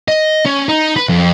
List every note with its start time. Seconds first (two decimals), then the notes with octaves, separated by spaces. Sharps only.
0.08 D#5
0.46 C#4
0.69 D#4
0.96 B4
1.09 F2